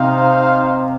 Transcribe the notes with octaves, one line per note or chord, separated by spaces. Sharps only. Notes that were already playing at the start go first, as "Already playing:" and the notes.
Already playing: C3 D#4 C5 F5